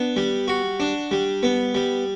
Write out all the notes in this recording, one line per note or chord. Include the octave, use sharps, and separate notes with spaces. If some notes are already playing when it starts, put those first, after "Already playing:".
Already playing: B3 D4
G3
F#4
D4
G3
B3
G3